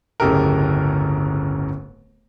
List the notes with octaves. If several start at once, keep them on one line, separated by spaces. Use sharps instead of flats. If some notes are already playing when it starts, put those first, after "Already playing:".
D1 G1 C#3 G4 A4 A#4